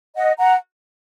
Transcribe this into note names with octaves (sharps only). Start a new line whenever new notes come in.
D#5 F#5
F#5 A#5